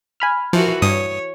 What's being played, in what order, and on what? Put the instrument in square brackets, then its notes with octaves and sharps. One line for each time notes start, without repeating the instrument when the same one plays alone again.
[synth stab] G#5 B5 F6
[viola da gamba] E3 F#4 A#4 [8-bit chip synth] F3
[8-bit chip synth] G2 D#6 [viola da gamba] C#5